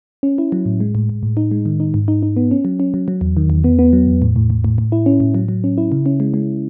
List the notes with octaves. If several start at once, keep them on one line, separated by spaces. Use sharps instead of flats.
C#4
E4
F#3
A2
G#3
A2
A2
A2
D#4
G#3
D#3
D#4
G#2
D#4
D#4
B3
C#4
F#3
C#4
F#3
F#3
E2
D#3
E2
B3
B3
F#3
E2
A2
A2
A2
A2
A2
E4
C#4
A2
F#3
F#3
C#4
E4
C#3
C#4
G#3
G#3